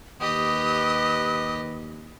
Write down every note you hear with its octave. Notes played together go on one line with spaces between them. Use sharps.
D#2 G4 B4 D#5 D#6